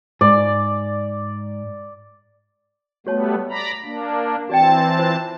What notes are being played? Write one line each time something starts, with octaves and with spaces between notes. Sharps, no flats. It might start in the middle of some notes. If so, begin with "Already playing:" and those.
G#2 D5
G3 A3 B3 F#4 C#5 A5
D5 A#5 B5
A#3 D4
E3 C4 F#4 D5 G5 A5
F4 C5